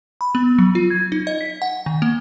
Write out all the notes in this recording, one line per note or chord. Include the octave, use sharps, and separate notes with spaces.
B5
B3
F#3
F4
G#6
D#4
D#5
B6
F#5
D#3
A#3